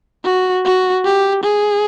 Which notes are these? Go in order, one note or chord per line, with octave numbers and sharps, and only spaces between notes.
F#4
F#4
G4
G#4